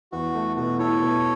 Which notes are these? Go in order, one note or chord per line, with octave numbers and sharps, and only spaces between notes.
E2 F#4
A3
B2 F#4
E4 A4 C#5
B2